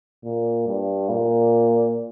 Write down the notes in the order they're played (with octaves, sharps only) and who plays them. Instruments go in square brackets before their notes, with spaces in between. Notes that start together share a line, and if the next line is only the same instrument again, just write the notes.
[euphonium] A#2
G2
A#2